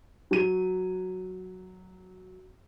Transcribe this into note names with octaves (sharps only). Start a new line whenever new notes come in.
F#3 D#7